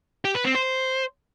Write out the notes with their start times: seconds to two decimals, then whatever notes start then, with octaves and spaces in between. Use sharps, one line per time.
0.25 G4
0.35 B4
0.45 C4
0.55 C5